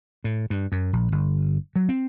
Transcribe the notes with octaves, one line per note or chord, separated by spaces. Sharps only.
A2
G2
F#2
A#1
G1
F#3
C4